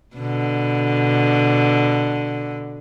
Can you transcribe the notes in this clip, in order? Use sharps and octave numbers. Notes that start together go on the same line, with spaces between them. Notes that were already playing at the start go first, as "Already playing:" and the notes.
B2 D3